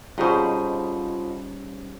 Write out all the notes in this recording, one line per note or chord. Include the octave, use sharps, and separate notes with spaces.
F2 B2 G3 C#4 D#4 F4 G#4 C5